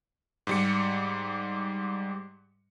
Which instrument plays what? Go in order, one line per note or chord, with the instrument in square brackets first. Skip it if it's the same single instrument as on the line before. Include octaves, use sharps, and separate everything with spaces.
[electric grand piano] G#2 G3 C#7